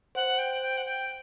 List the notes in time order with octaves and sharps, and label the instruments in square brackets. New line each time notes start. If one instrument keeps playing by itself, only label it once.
[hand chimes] C5 [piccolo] F#5
[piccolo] G5
G5
F#5
G5